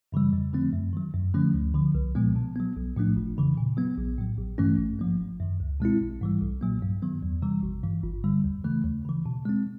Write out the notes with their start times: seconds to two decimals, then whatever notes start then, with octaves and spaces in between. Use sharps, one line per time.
0.12 F#2 C#3 E3 G3
0.33 F2
0.53 D3 F3 A3 C4
0.73 F#2
0.93 D#3 F#3
1.14 F#2
1.34 D3 F3 A3 C#4
1.54 D2
1.74 D3 F3
1.95 C2
2.15 A#2 F3 G#3 B3
2.36 B2
2.56 F#3 B3
2.76 B1
2.96 A2 F3 A3 D4
3.16 G1
3.37 F2 C#3 E3
3.57 A#2
3.77 F#3 B3
3.98 A#1
4.19 A2 F#3
4.38 A1
4.58 G2 E3 A3 C#4
4.79 A1
4.99 G#2 F3 A#3
5.20 G1
5.40 F#2 D#3
5.60 C#2
5.80 B2 G#3 C4 E4
6.01 A#1
6.21 G#2 E3 G3
6.41 B1
6.61 A#2 F#3 A#3
6.82 G2
7.02 D#3 F#3 B3
7.23 E2
7.42 C3 E3 G3
7.63 G#1
7.83 G2 E3
8.03 G1
8.24 G2 D3 G3
8.44 D#2
8.64 C#3 E3 A3
8.85 D#2
9.05 C#3 E3
9.26 B2
9.45 G#3 C4